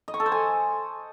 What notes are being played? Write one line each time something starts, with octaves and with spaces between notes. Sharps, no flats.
D#5
C#6
A4
C5
G#5